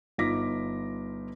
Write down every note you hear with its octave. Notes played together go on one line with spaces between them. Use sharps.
G1 D#4 F4 D6 A#6 B6